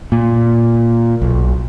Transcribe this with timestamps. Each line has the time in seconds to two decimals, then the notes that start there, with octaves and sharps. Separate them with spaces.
0.12 A#2
1.22 B1